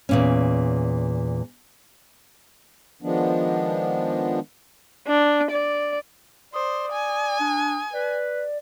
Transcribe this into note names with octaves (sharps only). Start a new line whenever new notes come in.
E2 A#2 C#4
D#3 F3 G#3 B3 D4
D4
D5
C5 D5 D#6
G#5
D4
B4 D5